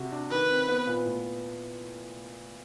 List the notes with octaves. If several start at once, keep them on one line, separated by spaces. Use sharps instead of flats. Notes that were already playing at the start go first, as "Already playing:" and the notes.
Already playing: C3 F#4
D4
D#3 B4
C4
B3
A#2
A2